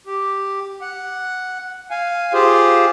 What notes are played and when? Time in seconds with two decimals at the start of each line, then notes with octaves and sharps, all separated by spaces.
0.07 G4
0.82 F#5
1.91 F5 G#5
2.33 F4 G4 G#4 C5